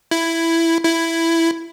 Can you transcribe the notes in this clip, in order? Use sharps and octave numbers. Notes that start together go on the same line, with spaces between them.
E4
E4